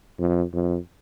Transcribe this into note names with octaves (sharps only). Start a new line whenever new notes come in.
F2
F2